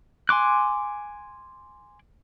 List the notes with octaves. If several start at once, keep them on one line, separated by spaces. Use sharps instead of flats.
G#5 C6 D6 F#6